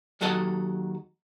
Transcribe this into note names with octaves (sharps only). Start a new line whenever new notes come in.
D#2 F#3 F#4 A4 D#5 A5